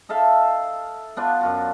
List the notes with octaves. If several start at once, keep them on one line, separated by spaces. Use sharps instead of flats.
D#4 A4 E5 F5
B3 D4 F4
F#2 F4 F#4